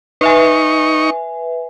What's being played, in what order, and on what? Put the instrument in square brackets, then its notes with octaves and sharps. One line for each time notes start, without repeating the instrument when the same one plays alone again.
[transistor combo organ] D#4 C#6 [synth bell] B4 E5 G#5